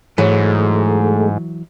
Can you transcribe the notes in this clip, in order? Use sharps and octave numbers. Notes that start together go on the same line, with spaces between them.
G#2 E3 F#3 G#3 A3